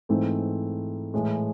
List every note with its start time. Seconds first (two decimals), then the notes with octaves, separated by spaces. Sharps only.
0.09 G#2 E3 A3 C4 D#4
1.14 A2 E3 G#3